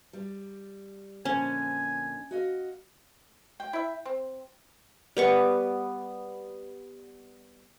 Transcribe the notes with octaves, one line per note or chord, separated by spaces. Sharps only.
G3
F2 A#2 D3 C#4 G#5
F#4 D#5 F5
G5
E4 E5
C4
G3 B3 C#6